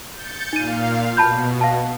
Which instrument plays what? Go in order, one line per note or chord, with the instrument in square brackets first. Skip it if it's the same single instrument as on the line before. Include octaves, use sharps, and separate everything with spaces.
[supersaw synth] G6 A6 C#7
[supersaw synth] A#2 F5 [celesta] D#4 D#7
[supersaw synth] B2 [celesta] A5 B5 G6
[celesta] F5 A5